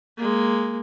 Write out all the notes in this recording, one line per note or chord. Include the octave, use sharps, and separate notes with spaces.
G#3 A#3